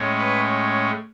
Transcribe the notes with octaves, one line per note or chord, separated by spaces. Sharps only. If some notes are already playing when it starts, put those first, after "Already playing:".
Already playing: A2 G#3 C#4
B4